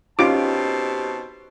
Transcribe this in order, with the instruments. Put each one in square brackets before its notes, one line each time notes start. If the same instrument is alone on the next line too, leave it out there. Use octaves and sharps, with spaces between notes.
[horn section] B2 C4 A5 [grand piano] C#4 D#4 [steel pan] F4 D6 [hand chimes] G4